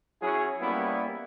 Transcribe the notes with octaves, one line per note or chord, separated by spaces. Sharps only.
F#3 C#4 E4 G#4
G3 A#3 B3 C#4 E4